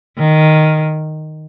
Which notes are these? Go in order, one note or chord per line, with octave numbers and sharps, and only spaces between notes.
D#3